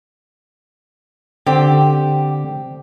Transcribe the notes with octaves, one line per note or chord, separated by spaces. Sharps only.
D3 C4 G4